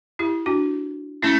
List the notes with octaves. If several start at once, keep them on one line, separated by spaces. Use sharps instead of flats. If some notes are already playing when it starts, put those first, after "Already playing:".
E4 G4
D4 F#4
A3 C#4 E4